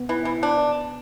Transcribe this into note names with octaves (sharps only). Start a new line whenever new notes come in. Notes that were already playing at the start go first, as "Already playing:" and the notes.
Already playing: B3
E3
E3
D4